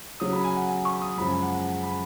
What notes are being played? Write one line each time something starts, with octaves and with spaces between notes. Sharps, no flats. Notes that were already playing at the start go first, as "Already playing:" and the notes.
C#3 F#3 C#4 D#6
B5
G#5
F#5
G#5
C#6
D#6
F#2 C#3 F3 G#3 B5
G#5
F#5
F#5
G#5
B5